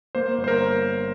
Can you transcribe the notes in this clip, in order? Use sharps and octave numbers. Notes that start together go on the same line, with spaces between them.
A#3 C5
G1
C5
A#4